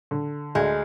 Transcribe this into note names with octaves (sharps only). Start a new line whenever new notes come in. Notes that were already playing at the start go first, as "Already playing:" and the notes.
D3
D2 G#3